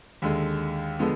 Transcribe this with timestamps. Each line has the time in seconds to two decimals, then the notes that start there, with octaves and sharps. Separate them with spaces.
0.22 D#2 D3 G#3
0.99 D3 F3 G#3 B3